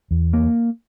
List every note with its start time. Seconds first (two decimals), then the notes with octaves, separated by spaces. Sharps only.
0.11 E2
0.33 A#3